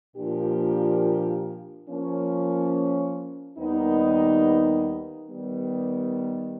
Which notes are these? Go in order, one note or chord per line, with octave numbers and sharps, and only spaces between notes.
A#2 F3 A#3 D4 G4
F3 A#3 C#4
D#2 D#3 G3 B3 D#4
D#3 G3 B3